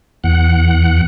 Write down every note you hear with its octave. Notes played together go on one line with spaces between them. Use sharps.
E2 F#5